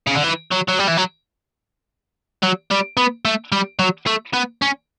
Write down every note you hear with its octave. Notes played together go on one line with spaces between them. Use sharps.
C#3
D3
E3
F#3
F#3
G3
E3
F#3
F#3
G3
B3
A3
G3
F#3
A3
B3
C#4